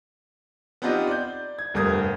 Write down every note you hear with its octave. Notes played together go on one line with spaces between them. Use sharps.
B3 C4 D4 D#4 F4 G4
D5 G6
G#6
F1 G2 A#4 D#6 G#6